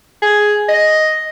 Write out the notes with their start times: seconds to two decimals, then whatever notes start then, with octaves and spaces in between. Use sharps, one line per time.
0.22 G#4
0.69 D#5